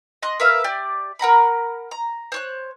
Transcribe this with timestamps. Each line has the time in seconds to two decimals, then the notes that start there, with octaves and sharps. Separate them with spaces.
0.23 D#5 C6 F#6
0.40 A#4 B4 E5 F5
0.64 G4 D5
1.19 A#4 F#5 A#5 B5
1.91 A#5
2.32 C5 C#5 F#6